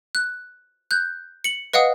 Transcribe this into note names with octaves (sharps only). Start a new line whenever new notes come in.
F#6
F#6 G6
C#7 F#7
B4 D#5 F5 F#5 D#6